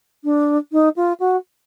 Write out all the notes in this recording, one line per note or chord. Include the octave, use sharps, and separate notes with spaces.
D4
D#4
F4
F#4